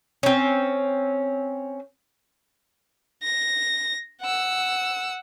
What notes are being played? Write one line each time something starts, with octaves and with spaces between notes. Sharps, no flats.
C4 C#4
A#6
F#5 E6